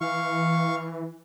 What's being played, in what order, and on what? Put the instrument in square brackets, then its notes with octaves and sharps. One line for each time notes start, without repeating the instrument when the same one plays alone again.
[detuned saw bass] E3 [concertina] F5 C#6